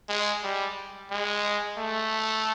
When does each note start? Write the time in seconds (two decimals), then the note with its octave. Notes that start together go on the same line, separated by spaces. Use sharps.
0.09 G#3
0.43 G3
1.10 G#3
1.78 A3